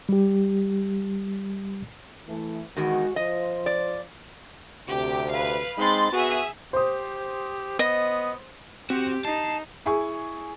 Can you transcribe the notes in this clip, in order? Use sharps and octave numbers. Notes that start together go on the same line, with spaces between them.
G3 G4
E3 A3
E2 D#3 G#3 F#4
F3 F4 C5 D#5
D5
D2 C3 G4
B4 F5
G#3 C4 D#4 B5 C6 A6
B3 F#4 G#4 E5
G4 C5 D#6
B3 D#5
C4 F#4 G4
D#4 A5 C7
E4 G#4 G#5 C#6